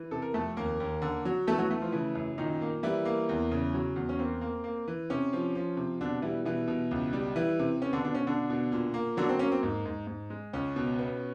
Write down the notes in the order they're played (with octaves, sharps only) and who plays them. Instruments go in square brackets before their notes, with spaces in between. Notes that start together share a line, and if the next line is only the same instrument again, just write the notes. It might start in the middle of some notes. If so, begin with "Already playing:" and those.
Already playing: [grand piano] E3
C3 A4
A#4
F2 A3 A4
D#2 A#3 A#4
D#2
D3
F#3
E3 A3 A4
F#3 F#4
A3
F3 F4
C#3 E3 E4
F#2
A#2 D#3 D#4
A#3
E3 G3 E4
A#3
E2
C#3
F#3
E2
C#4
A#3 C4
A#3
A#3
E3
C3 C#4
F3
F3
C3
B2 D3 D4
E3 G3 E4
B2 E3 E4
B2
C#2
G3
E3 E4
C3
B3 C#4
D3 D4
B2 D3 D4
C#4
B2 D3 D4
B2
A#2
A#3
D3 F#3 D4
C4
A#3 C#4
C4
G#2
G#2
G#2
G#3
C#2 C#4
B2
B3